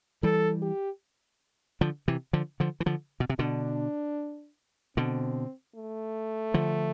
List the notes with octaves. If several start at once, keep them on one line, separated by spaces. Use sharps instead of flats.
E3 G3 A4
G4
D3 F3
C3 E3
D3 F3
D3 F3
E3
D3 F3
B2
C3
B2 D3 D4
B2 D3 C4
A3
D3 F3